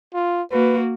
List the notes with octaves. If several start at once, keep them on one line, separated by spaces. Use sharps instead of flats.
F4
A#3 F#4 B4